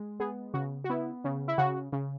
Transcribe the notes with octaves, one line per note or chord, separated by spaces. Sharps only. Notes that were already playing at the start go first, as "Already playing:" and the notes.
Already playing: G#3
B3 G#4
C#3 F#4
F#4
B3 E4
C#3
E4
C#3 F#4
C#3